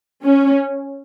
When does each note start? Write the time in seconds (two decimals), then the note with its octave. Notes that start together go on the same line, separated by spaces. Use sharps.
0.24 C#4